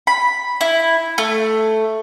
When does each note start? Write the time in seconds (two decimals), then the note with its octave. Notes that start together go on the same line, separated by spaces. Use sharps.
0.07 B5
0.61 E4
1.18 A3